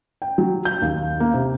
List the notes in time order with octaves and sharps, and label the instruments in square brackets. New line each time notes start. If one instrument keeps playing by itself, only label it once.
[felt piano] G5
F#3
G6
D#2
A#3
C3